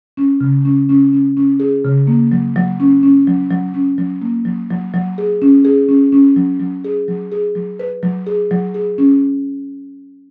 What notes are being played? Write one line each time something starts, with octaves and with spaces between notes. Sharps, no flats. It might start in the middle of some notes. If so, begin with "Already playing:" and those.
C#4
C#3
C#4
C#4
C#4
C#4
G#4
C#3
A#3
F#3
F#3
C#4
C#4
F#3
F#3
C#4
F#3
A#3
F#3
F#3
F#3
G#4
C#4
G#4
C#4
C#4
F#3
F#3
G#4
F#3
G#4
F#3
B4
F#3
G#4
F#3
G#4
C#4